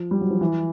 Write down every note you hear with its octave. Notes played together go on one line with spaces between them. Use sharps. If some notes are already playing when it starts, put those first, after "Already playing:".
Already playing: F3
G3
F#3
F3
E3